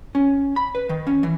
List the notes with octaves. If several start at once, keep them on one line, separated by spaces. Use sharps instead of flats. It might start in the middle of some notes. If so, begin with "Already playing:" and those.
C#4
B5
B4
D#3
C#4
E3